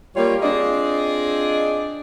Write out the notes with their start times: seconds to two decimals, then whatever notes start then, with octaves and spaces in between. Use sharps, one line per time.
0.16 G3 A#3 F4 G4 C#5
0.41 C4 D4 F4 G#4 D5 D#5